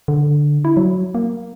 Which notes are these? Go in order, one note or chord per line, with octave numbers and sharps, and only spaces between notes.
D3
E4
F#3
A#3